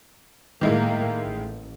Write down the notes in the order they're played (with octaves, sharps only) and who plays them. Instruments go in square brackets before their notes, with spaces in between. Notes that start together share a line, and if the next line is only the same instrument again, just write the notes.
[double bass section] A2 A#3 [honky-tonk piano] D#3 G#3 E4
[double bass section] A1